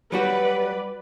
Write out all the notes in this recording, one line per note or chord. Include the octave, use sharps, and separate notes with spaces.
F#3 G3 F#4 B4 D5